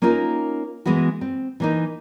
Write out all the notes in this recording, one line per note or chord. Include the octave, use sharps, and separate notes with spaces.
A#3 C#4 D#4 F4 A#4
E3 G#3 B3 E4 F#4
C4
E3 A#3 D#4